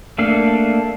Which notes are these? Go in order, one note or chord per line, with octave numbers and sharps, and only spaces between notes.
A3 A#3 D4 A4 F5